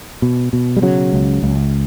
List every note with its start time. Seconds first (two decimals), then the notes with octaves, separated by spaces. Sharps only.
0.22 B2
0.53 B2
0.77 G3
0.82 C#3 F#3
1.13 C#2
1.43 C#2